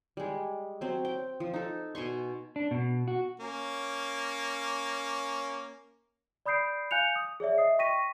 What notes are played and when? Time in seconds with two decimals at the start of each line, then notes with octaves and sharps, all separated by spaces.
0.17 G3 G#3
0.81 F#3 C4
1.05 G5
1.40 F3
1.54 D#4 A4
1.95 B2 G#5 C6 C#6
2.56 D4
2.71 B2
3.08 F#4
3.40 A#3 C#4
6.46 D5 B5 D#6 G6 C7 D7
6.91 F5 G#5 F#6 G6 C#7 F7
7.16 D#6
7.40 G#4 C#5 D5 E5
7.58 D#5 E5 D#6 C7
7.79 G5 C#6 A#6 B6 D#7